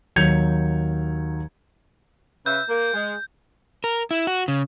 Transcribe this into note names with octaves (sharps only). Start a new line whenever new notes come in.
D#2 F#3 G6 G#6 C#7 F7
C#3 B4 E5 G6
A#3
G#3
A#4
E4
F#4
C#3